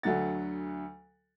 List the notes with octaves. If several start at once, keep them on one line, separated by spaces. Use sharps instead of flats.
D2 D3 F#3 F#5 A6